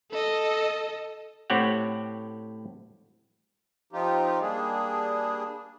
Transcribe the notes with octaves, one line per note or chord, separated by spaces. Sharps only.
A4 D#5
A2 C4 G4 C#5 F#5
F3 C4 D#4 F4 G4
G3 A#3 D4 G#4